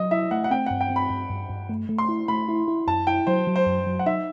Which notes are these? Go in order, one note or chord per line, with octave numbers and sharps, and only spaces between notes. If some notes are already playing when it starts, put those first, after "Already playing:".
Already playing: F#3 D#5
E4 E5
A3 F#5
F#5
C4 G5
G2 F#5
G5
C4
B5
G2
G2
G2
A3
A3
C6
E4
A3 B5
E4
E4
F#2 A5
E4 G5
F#3 C5
F#3
C5
F#2
F#3
F#5
D#4 E5